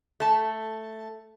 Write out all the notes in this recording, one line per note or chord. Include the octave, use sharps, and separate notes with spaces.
A3 A5